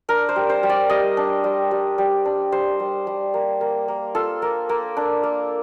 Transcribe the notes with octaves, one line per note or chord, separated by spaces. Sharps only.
D4 A#4
C5
G3
C5
G3
D5
G3 D#5
D4
G3
G3
G3
D4
G3 C5
G3
G3
A#3
A#3
A#3
F4 A4
A#3
A#3
D4
A#3